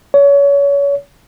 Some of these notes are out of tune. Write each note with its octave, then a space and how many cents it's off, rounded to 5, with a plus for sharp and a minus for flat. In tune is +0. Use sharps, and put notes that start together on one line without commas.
C#5 +30